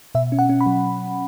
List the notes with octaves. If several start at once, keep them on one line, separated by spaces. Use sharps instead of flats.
B2 E5
C#4
F#5
C#4
B5
F#3